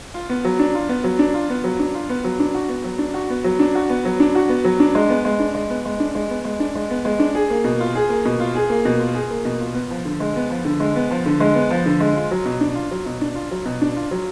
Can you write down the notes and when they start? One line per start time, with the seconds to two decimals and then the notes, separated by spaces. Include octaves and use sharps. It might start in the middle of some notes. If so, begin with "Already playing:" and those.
0.14 F4
0.29 B3
0.45 F#3
0.59 D4
0.75 F4
0.89 B3
1.04 F#3
1.19 D4
1.34 F4
1.50 B3
1.64 F#3
1.79 D4
1.94 F4
2.09 B3
2.24 F#3
2.40 D4
2.54 F#4
2.69 B3
2.84 F#3
2.99 D4
3.14 F#4
3.30 B3
3.44 F#3
3.59 D4
3.75 F#4
3.89 B3
4.05 F#3
4.20 D4
4.35 F#4
4.49 B3
4.64 F#3
4.80 D4
4.95 G#3
5.09 B3
5.25 G#3
5.40 D4
5.54 G#3
5.70 B3
5.85 G#3
6.00 D4
6.15 G#3
6.30 B3
6.45 G#3
6.60 D4
6.75 G#3
6.90 B3
7.05 G#3
7.19 D4
7.35 G#4
7.50 A#3
7.64 B2
7.80 F4
7.95 G#4
8.09 A#3
8.25 B2
8.40 F4
8.55 G#4
8.70 A#3
8.85 B2
9.00 F4
9.15 G#4
9.30 A#3
9.45 B2
9.60 F4
9.75 B3
9.91 F3
10.05 D3
10.20 G#3
10.36 B3
10.50 F3
10.65 D3
10.80 G#3
10.96 B3
11.11 F3
11.26 D3
11.40 G#3
11.55 B3
11.70 F3
11.86 D3
12.00 G#3
12.16 F4
12.31 F#3
12.46 B2
12.61 D4
12.75 F4
12.91 F#3
13.06 B2
13.21 D4
13.35 F4
13.51 F#3
13.66 B2
13.81 D4
13.96 F4
14.11 F#3